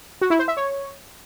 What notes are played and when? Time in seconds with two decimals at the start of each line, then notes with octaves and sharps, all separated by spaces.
0.21 F#4
0.30 E4
0.39 C5
0.48 E5
0.57 C#5